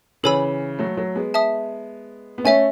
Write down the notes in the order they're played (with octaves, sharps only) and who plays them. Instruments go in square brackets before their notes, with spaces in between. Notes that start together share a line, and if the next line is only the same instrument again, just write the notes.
[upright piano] C#3 E3 [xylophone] A4 C#5 G#5 B5 E6
[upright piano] F#3 A3
F#3 A3
G#3 B3
[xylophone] E5 A5 D#6
[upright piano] B3
[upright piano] A3 C#4 [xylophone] C#5 E5 G#5